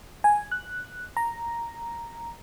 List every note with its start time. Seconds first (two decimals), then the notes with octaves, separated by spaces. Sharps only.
0.24 G#5
0.52 F#6
1.17 A#5